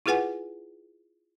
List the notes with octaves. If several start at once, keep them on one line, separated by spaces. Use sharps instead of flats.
E4 F4 G#4 B4 F#5 G#5